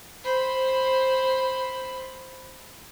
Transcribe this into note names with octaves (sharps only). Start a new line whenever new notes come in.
C5 B5